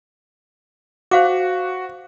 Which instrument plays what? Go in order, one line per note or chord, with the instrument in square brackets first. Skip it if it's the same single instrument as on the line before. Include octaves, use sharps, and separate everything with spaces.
[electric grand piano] F#4 [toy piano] C5 F5 D6